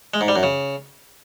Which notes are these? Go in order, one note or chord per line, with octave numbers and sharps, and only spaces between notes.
G#3
G#2
G3
F#2
C#3